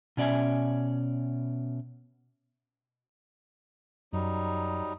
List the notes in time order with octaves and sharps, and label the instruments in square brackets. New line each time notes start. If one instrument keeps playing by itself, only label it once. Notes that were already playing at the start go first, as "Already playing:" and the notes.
[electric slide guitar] B2 C#4 D5 E5 G#5
[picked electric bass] F#2 [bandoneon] F#3 G3 D#4